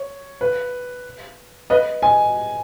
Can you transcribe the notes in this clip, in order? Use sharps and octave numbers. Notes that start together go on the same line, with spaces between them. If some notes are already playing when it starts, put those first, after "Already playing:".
Already playing: C#5
B4
B4 D#5
D#5 G#5